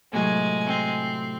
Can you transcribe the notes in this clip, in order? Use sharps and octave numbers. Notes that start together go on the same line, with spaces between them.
A2 C3 F#3 G#3 G#5
C4